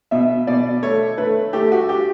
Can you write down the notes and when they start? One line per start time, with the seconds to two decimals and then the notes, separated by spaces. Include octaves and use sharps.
0.11 B2 E5
0.47 B2 D5
0.82 A3 C#5
1.18 A3 B4
1.53 A3 G4
1.72 F#4
1.89 G4